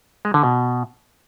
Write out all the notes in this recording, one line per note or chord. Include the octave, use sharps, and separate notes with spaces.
G#3
D3
B2